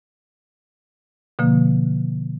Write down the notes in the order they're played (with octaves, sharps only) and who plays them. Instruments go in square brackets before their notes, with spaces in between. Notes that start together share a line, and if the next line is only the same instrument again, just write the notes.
[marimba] B2 D3 F3 A#3